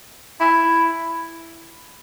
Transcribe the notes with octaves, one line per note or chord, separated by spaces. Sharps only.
E4